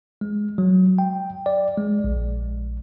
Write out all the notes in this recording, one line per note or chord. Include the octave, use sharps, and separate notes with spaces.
G#3
F#3
G5
D5
G#3
A#1